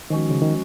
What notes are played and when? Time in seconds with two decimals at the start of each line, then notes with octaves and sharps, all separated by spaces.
0.10 D#3 F3 G#3 C#4 F#4
0.30 C#3
0.42 D#3